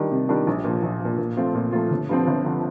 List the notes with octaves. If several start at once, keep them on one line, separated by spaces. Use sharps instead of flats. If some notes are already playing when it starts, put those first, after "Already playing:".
Already playing: D#3 G3 D4
C3
D#3 G3 D4
A#1
A#2 F3
A#1
A#2 F3
A#2
F3 A3 C4 F4
A#2
F3 A3 C4 F4
G1
G2 D3 F3 C4
G1
D3 F3 C4